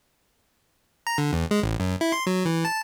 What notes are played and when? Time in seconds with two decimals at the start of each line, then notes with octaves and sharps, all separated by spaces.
1.07 A#5
1.18 D3
1.33 E2
1.51 G#3
1.63 A1
1.80 F#2
2.01 E4
2.12 C6
2.27 F#3
2.45 E3
2.65 A5